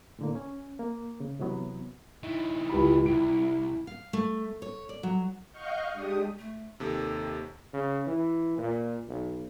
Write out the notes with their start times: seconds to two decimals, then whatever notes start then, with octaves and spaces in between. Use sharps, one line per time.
0.19 A2 D3 A#3
0.35 C#4 G#5
0.79 A#3
1.20 C#3
1.39 C3 E3 F#3 B3
2.23 E3 D#4
2.70 C#2 E4 G4 B5
3.06 C2 G5 D7
3.87 F5
4.13 A3
4.62 C#5
4.89 D5
5.03 F#3
5.52 D#5 F5 F#5 C#6 F6 G6
5.92 G#3 D4 G4 D#6
6.39 A3
6.80 D#2 C3 A4
7.73 C#3
8.07 E3
8.58 A#2
9.08 B1